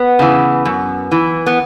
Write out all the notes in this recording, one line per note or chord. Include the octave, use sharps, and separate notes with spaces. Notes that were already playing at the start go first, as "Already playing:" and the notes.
Already playing: B3
C#3 E3
F#2
E3
B3